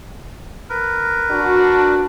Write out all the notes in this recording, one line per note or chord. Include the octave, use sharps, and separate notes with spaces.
A#4 B4
D4 F#4